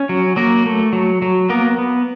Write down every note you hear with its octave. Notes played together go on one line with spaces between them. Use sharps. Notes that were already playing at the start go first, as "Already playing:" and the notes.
Already playing: C#4
F#3
F#3 A#3 A#4
A3
F#3
F#3
A#3 B3 A#4
B3